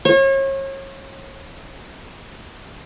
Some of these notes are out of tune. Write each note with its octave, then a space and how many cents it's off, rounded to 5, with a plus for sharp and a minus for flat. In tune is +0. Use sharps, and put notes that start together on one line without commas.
C#5 -35